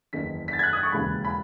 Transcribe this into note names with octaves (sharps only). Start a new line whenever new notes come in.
F#1 E2 D#3 B6
B6
A6
G#6
F#6
D#6
C#6
E1 D#2 C#3 E3 B5
B5